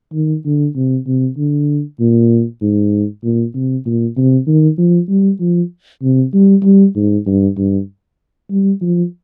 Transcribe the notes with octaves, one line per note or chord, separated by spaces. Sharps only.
D#3
D3
C3
C3
D3
A#2
G#2
A#2
C3
A#2
C3
D#3
F3
G3
F3
C3
G3
G3
G#2
G2
G2
G3
F3